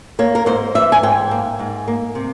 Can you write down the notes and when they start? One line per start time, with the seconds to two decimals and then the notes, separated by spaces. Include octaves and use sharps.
0.19 A#3 C#5
0.35 A#4
0.46 G#2 C5
0.75 E3 E5
0.92 G#5
1.03 G#2 G5
1.31 A#3
1.59 G#2
1.88 A#3
2.15 C3